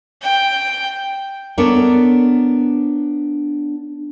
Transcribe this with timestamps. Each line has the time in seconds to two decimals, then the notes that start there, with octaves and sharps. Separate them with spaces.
0.22 G5
1.58 B3 D4 A4 A#4 C#5 D5